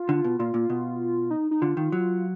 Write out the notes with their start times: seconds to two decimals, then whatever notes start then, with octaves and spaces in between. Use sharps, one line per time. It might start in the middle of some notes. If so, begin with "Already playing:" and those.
Already playing: F4
0.09 D3
0.24 B2
0.39 A#2 F4
0.54 A#2
0.70 B2
1.30 D#4
1.51 D#4
1.62 D3 F4
1.77 D#3
1.92 F#3